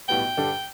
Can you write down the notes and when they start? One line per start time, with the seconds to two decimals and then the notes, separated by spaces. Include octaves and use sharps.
0.09 B1 A2 G3 B3 G5
0.37 G2 D3 G3 D4 A4